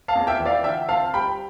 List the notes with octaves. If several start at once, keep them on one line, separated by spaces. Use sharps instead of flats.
F5 A5
E2
E5 G5
E3
D5 F5
D3 E5 G5
C4 F5 A5
G3 G5 B5